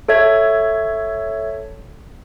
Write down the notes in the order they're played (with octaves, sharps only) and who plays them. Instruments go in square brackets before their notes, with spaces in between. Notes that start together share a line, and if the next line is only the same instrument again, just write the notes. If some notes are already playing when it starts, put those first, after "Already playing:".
[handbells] A4 C#5 E5 G#6